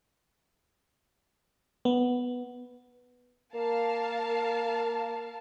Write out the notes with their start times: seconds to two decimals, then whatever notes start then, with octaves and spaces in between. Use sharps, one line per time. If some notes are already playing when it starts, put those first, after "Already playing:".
1.85 B3
3.54 A#3 A#4 F5 A5